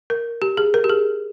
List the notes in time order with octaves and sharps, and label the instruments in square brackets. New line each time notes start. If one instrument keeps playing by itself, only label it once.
[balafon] A#4
G4
G#4
A#4
G4
G#4